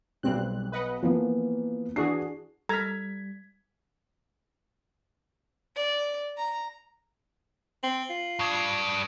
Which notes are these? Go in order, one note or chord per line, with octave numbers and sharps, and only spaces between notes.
B1 B2 G3 C4 F#6
B4 D#5 F#5
E3 F3 A#3 B3
E3 D4 F#4 G#4 C7
G3 A4 A#5 F6 G#6 B6
D5
A#5
C4 F#7
F4
G2 D4 C#6 D#6 G#6